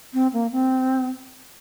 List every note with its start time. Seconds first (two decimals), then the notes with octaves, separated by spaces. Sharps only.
0.13 C4
0.33 A#3
0.52 C4